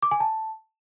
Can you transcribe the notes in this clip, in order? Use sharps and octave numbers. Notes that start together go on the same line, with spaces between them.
D6
G#5
A5